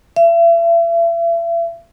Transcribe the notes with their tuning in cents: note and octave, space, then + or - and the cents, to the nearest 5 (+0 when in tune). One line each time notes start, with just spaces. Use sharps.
E5 +40